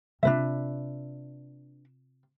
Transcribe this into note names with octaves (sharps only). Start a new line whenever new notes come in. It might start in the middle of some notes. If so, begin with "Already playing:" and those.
C3 D4 F4 B4 E5